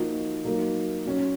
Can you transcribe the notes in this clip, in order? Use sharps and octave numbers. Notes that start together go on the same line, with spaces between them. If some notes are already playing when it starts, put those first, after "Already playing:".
Already playing: F3 A#3 D#4 F#4
F#3 A#3 D#4
F#3 C#4 F#4